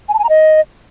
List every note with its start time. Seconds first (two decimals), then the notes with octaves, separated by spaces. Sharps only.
0.09 G#5
0.14 A5
0.19 G#5
0.24 A#5
0.29 D#5